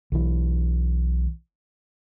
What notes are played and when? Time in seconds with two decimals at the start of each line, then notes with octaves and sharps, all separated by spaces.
0.12 B1 E3